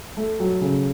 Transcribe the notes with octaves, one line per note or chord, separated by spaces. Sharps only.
A3
F#3
C#3